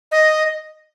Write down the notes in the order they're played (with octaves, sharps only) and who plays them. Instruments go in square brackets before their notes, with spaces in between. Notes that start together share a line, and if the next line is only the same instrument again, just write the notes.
[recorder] D#5